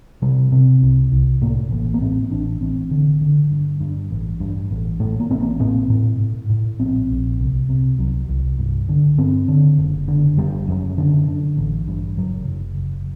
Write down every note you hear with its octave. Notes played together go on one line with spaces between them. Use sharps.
C3 G3
C3
C2
C2
A2 A#3
A1
A#3
A2 C4
A1 D4
A1 C4
D3
D3
G2
G2
A1
G2
A1
A2 A3
A#3
A1 C4
A#3
A2 C4
A2
A2
A2
A#1 C4
A#1
C2
C3
C2 F#3
C2
G2
D3
G2 C4
D3
F#1
D3
F#1 G3
F#2
D3
D3
A1
G2
F#1 F#3
F#1
F#1